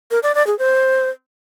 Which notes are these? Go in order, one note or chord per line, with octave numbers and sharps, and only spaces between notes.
A#4
D5
D5
G#4
C5